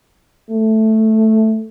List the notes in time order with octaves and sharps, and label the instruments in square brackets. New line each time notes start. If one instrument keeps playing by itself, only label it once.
[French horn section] A3